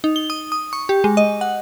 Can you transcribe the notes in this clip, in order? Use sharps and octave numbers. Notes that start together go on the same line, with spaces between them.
D#4
G7
D#6
D#6
C#6
G4
G#3
D#5
F#5